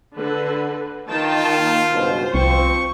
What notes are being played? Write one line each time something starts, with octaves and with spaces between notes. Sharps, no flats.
D3 B4
D#3 F4 G5 A5
A#3
C#2 G2 B2 C5
C2 F3 C4 C#6